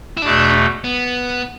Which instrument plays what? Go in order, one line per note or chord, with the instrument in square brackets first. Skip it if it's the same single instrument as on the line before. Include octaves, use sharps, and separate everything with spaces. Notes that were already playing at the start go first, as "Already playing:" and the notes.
[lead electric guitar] E4
[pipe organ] E2 B2 A3 [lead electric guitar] D4
[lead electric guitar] B3